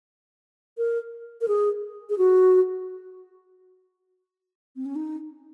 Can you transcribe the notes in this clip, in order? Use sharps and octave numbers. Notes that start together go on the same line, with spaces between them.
A#4
A#4
G#4
G#4
F#4
C4
C#4
D#4